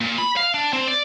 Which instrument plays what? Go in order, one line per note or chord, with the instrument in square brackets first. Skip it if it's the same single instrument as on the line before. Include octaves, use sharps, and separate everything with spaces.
[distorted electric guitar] A#2
B5
F5
D4
C4
D5